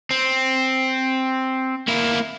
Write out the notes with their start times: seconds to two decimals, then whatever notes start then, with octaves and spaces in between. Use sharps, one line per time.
0.11 C4
1.88 A#3 E4